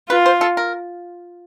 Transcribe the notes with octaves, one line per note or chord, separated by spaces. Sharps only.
F4 B4
C5
A4
A#4